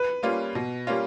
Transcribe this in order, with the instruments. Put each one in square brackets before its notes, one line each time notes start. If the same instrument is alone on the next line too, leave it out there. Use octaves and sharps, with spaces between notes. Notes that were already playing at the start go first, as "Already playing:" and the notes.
Already playing: [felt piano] B4
[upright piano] G3 A#3 C#4 F4
B2
G3 A#3 C#4 F4